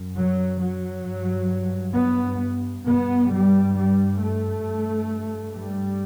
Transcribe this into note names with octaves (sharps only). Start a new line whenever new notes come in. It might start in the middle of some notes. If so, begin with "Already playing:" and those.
Already playing: F#2
F#3
F#3
G2
B3
G2 B3
G3
G3
A3
G2
G3